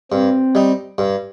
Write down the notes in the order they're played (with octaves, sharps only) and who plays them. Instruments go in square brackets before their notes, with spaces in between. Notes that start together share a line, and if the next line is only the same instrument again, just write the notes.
[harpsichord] G2 [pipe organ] C4
[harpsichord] G3 D#4
G2